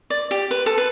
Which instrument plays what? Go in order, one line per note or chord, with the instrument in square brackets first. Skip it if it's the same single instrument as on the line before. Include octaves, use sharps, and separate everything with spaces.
[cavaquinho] D5
G4
B4
A4
B4